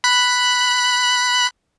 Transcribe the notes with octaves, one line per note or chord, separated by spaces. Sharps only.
B5 F#6